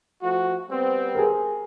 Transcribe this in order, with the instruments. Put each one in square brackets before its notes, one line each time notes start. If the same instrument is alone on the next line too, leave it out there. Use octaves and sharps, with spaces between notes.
[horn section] F3 A3 F#4
G3 B3 C4
[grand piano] G#4 A#4